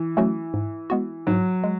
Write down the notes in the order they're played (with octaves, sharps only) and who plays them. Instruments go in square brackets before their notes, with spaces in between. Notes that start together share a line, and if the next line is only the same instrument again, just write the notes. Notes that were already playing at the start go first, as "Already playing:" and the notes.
Already playing: [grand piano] E3
[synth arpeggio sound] F#3 A3 C#4 F#4
G#2
G#3 B3 F#4
[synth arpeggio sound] G#2 [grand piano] F#3
[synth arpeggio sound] G#3